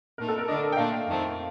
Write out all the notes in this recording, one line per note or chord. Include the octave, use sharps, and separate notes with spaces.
A#2 A3 D#4 A#4
A4
A#4
D3 A3 D4 D#5
G5
A#2 A3 D4 F5
F2 D#3 A3 C4